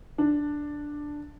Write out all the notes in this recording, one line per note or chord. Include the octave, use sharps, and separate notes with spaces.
D4